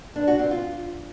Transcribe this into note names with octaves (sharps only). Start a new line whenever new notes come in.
D4
F#4
C4
F4